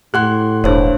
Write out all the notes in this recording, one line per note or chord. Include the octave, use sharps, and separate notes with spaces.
A2 G4 F#5 C6 F#6
E1 G2 C5 C#5